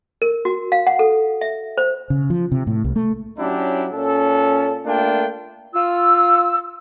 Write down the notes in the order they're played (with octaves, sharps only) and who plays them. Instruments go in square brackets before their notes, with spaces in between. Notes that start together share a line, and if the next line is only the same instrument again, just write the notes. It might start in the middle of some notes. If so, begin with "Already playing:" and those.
[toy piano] A#4
F#4
F5
F#5
A4
E5
C5
[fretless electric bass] C#3
F3
C3
A2
C2
A3
[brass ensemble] F#3 C#4 D4 E4 G4
A#2 C#4 A4
A3 A#3 D4 F4 G5
[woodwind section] F4 E6